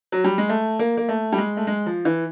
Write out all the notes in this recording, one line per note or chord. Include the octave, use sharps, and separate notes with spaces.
F#3
G3
G#3
A3
A#3
A#3
A3
G3
G#3
A3
G#3
F3
E3